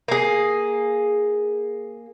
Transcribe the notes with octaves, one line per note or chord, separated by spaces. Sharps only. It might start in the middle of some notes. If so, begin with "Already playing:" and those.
A#3 G#4